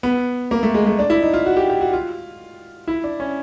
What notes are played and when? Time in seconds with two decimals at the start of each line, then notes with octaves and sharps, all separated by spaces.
0.03 B3
0.51 A#3
0.63 A3
0.74 G#3
0.86 A3
0.99 D4
1.10 E4
1.22 D#4
1.33 F4
1.46 F#4
1.57 G4
1.70 G4
1.81 F#4
1.93 F4
2.88 E4
3.04 D4
3.20 C#4